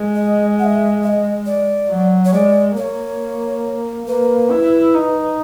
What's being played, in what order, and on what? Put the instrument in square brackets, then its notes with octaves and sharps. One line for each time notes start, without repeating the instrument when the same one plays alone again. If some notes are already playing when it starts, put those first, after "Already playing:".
Already playing: [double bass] G#3
[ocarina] D#5
F#5
E5
E5
D#5
D5
[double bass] F#3
[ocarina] C#5
[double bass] G#3 [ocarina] D5
[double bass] A#3 [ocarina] C#5
[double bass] A#3 [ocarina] B4
[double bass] E4
D#4